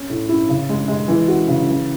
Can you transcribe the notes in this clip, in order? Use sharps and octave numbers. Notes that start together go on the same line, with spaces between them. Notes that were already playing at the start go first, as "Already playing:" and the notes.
Already playing: C#4
A2
E4
C#3
G#3
G#3
E3
F#4
C#3
E3